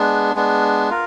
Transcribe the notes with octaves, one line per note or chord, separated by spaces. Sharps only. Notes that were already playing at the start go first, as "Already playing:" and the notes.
Already playing: G#3 B3 D4
G#3 B3 D4
F4 A#4